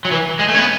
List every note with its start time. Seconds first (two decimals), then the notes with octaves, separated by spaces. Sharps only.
0.05 F#3
0.11 E3
0.39 G#3
0.48 A3
0.55 C#4
0.59 B3